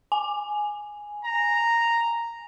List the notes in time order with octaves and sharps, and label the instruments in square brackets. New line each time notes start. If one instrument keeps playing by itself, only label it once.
[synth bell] G#5
[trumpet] A#5